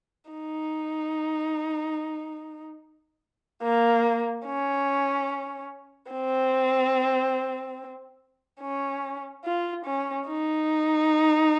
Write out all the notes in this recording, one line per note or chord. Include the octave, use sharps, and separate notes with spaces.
D#4
A#3
C#4
C4
C#4
F4
C#4
D#4